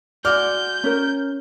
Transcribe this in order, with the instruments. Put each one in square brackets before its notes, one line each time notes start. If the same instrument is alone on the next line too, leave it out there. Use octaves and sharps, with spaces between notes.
[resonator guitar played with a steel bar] G#3 F#4 D5 [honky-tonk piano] F6 [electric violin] G6
[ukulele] C#4 A#4